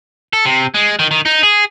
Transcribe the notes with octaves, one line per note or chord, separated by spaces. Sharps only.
A4
C3
G#3
D#3
D#3
D#4
G#4